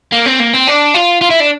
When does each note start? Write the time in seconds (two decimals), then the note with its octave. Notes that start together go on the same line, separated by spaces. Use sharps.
0.12 A#3
0.26 C4
0.40 A#3
0.54 C4
0.67 D4
0.94 F4
1.21 F4
1.31 E4
1.40 D4